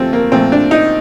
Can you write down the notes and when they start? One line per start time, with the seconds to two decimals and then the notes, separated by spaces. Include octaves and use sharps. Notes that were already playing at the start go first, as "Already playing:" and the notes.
Already playing: C3 F3 A3 C4
0.13 A#3
0.32 A#2 F3 A3 C4
0.52 D4
0.71 D#4